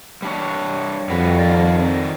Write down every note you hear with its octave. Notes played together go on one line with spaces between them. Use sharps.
G3 D4 C#5
F2 G3 F#4 B4
D#3 A#4 D5